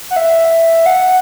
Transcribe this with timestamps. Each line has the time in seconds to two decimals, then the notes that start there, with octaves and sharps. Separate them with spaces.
0.11 F#5
0.16 E5
0.86 F#5